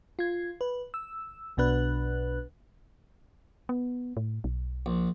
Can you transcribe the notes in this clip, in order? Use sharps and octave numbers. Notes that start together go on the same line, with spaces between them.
F4 G#6
B4
E6
B1 B2 D4 B4 F#6
B3
A2
B1
A#1